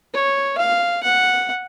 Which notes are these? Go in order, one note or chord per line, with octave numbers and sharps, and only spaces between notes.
C#5
F5
F#5